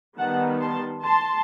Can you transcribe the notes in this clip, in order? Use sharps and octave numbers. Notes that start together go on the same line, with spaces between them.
D#3 G3 B3 F#5 A5
A5 C6
A5 C6